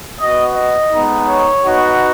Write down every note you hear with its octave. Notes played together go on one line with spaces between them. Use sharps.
B3 F#4 D#5
D#5
G#3 B3 D#4
C#5
B3 D#4 F#4